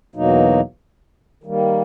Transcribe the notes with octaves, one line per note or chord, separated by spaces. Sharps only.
E2 B2 F#3 A#3 D#4
D#3 G3 A#3